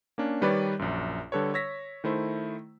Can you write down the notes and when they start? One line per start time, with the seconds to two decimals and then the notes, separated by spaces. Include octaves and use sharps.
0.18 A#3 C#4 D4
0.41 D#3 G3 D#4 B4 C#5 D5
0.79 A#1 F#2
1.32 D3 G3 A4 B4 C#5
1.54 C#5 E6 A#6 B6
2.04 D#3 A3 E4 C5